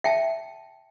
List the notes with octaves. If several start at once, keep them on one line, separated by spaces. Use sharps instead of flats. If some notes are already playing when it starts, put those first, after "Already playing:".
E5 G5 A5